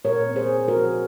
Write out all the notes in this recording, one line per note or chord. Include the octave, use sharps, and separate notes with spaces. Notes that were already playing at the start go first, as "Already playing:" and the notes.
A#2 A#4 C#5
C4
G#4 C5
A#2
F#4 A#4
F3